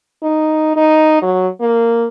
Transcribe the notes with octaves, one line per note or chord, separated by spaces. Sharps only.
D#4
D#4
F#3
A#3